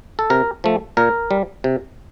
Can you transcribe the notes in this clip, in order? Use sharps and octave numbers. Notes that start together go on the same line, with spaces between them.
A4
C3 A#4
F3 A3
A#2 A#4
G3
C3